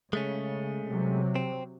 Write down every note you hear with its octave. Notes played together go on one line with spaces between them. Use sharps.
C#3 G#3 A3 C#4
C3 F#3
C4